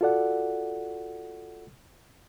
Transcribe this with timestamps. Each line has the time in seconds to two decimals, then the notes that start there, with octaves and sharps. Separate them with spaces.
0.01 F4 F#4 A4 D5 F#5